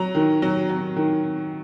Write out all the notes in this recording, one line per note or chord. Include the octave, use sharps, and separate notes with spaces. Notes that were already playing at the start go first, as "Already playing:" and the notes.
Already playing: F#3 A#5
D#3
F#3
F#3
D#3